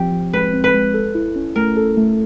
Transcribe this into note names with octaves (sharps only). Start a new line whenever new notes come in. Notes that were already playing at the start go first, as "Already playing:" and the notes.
Already playing: F3 C4 G4
F3
G#3 B4
C4
B4
G#3
A4
E4
C#4
A3 A#4
A4
A3